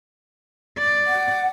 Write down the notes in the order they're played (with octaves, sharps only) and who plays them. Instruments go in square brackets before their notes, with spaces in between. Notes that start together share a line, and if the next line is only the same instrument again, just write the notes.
[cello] D5
[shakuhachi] F#5